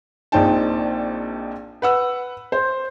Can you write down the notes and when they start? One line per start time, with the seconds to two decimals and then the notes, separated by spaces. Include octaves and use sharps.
0.32 A#1 A#2 C4 D#4 G5 A5
1.82 B4 F#5 E6
2.52 C5